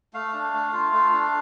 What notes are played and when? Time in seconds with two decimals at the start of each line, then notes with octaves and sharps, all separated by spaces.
0.13 A3 F5
0.33 D4
0.53 A3
0.72 F4
0.92 A3
1.13 D4